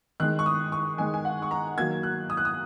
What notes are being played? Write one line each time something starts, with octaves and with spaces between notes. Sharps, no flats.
D#3 G#3 F#6
C#6
D#6
C#6
D#3 G#3 G#5
G#5
F#5
C#6
A#5
D#3 F#3 A#3 G#6
F#6
D#6
F#6
D#6